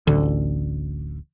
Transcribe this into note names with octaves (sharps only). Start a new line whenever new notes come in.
D1 A1 D2 D3